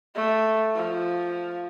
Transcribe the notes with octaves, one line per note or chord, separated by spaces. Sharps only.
A3
F3